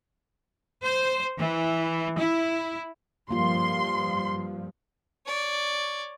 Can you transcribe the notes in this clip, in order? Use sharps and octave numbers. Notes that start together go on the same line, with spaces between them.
C5
E3
E4
G2 F3 A#3 F4 C6
C#5 D5